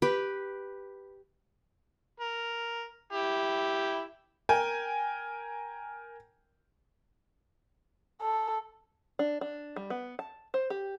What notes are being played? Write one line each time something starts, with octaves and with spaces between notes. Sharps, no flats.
G4 B4
A#4
E4 G4
A#4 G5 G#5
A4
D4
D4
G3
B3
A5
C5
G4